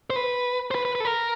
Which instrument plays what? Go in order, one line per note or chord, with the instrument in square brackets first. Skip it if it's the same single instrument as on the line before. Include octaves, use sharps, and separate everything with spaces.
[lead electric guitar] C5
B4
C5
B4
B4
B4
A4
A#4